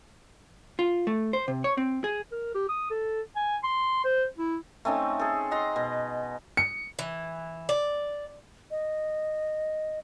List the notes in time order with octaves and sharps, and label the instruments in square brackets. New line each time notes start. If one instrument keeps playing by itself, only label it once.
[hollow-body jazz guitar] F4
A3
C5
C3
C#5
C4
G#4
[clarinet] A#4
G4
D#6
A4
G#5
C6
C5
E4
[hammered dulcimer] A3 C4 C#4 D#4
G#4 A4
D#5 F#5 A#5 C6
B2
[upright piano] C#7
[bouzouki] E3
D5
[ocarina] D#5